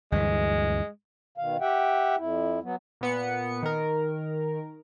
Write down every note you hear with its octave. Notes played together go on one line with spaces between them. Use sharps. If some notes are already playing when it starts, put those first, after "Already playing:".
D2 G2 E3 G#3
B2 D#3 F5
G4 E5 F#5 G5
F2 E4
F#3 B3
A#2 B3 C#7
D#3 A#4